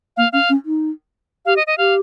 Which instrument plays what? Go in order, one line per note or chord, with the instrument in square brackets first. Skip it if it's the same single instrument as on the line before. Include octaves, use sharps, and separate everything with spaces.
[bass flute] A#3 [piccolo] F5
[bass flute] C#4 [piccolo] F5
[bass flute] C#4
D#4
[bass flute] G4 [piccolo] F5
[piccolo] D#5
D#5
[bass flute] G4 [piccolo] F5